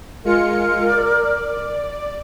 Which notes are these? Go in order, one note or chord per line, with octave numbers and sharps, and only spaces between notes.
G#3 F4 A#4 C#7
D5